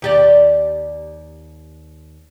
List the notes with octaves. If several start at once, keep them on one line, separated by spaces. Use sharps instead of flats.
D#2 G4 D5